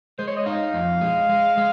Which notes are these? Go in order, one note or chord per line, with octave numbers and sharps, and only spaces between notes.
G#3 C5
C#5
D#5
D#4 F5
F2
G#3
G#3
G#3